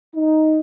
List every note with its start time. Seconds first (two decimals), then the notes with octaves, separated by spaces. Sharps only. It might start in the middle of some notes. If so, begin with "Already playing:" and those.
0.16 D#4